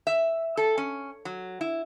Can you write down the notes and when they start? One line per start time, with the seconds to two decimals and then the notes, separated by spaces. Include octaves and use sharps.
0.07 E5
0.57 A4
0.78 C#4
1.25 F#3
1.61 E4